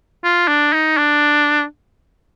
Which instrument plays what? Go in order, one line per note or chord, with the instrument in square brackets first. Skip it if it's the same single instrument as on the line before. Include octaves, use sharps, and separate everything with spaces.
[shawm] F4
D4
D#4
D4